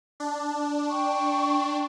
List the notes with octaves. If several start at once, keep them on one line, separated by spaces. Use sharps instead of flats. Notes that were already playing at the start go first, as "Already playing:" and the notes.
D4
G5 C#6